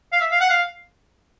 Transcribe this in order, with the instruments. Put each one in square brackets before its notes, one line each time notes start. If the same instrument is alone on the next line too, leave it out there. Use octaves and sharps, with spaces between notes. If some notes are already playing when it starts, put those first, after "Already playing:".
[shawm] F5
E5
F5
F#5
F5